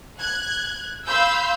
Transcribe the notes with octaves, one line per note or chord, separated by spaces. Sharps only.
F#6 G#6
F5 B5 C6 E6 G6